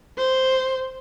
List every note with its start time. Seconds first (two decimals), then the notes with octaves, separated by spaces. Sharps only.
0.18 C5